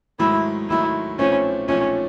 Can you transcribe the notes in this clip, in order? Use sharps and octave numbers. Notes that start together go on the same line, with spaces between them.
G#2 D#3 F#3 A3 E4
G#2 D#3 F#3 A3 E4
B1 A#2 F3 A3 C4 C#4
B1 A#2 F3 A3 C4 C#4